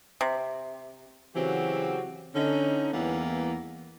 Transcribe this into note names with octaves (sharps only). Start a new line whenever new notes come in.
C3
C#3 E3 F#3 C4 F#4 G4
D3 C#4 D#4
E2 E3 G3 A#3 B3